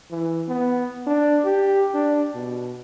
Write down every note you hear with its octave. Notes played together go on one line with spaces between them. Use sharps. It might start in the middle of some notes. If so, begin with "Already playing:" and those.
E3
B3
D4
G4
D4
B2